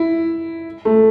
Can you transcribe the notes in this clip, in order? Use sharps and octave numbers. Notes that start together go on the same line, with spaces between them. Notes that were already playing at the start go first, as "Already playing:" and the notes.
Already playing: E4
A3